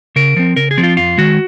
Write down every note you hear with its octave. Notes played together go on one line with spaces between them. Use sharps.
C#3 A#4
F3 C4
C#3 A#4
G#4
F3 C4
F4
F2 F4
D#3 G#3 F#4